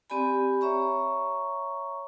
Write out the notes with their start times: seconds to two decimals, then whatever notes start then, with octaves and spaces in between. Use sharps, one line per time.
0.10 C4 G4 D5 G#5 B5
0.61 C#5 E5 A#5 C#6